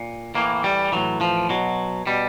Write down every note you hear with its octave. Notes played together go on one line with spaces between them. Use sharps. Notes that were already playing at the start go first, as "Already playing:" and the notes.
Already playing: A#2
A2 E3 A#3
G3
A2 E3 F#3
F3
B2 F#3
B2 G3